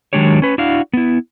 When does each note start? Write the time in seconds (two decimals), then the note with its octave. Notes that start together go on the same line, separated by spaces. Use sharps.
0.13 D#3 F#3 G#3 D4 G4 C#5
0.42 C#4 B4
0.58 D4 E4 F#4 F5
0.93 B3 E4